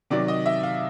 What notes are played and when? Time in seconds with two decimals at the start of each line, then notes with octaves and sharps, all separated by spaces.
0.10 C3 D#3 F#3 D5
0.28 D#5
0.46 E5
0.63 F5